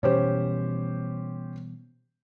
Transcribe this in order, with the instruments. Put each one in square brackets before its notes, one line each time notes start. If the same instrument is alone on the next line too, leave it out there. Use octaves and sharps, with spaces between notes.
[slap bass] B2 E3 G3 [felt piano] C#4 G4 C5